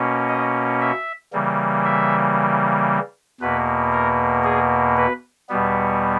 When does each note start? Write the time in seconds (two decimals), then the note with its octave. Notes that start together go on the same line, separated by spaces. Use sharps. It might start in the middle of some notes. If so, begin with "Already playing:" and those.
Already playing: B2 A#3 C#4
0.28 D#5
0.81 E5
1.32 C#3 E3 G3 A#3
1.85 E5
3.40 E2 B2 A#3 B4
3.92 A#4
4.44 G#4
4.97 B4
5.49 E2 B2 G3 B3